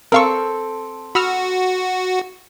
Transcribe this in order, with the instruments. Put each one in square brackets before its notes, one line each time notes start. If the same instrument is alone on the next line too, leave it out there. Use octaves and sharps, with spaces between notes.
[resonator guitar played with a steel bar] C4 A4 [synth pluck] A#4 F5 C#6
[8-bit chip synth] F#4 [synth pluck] B5 E6 F6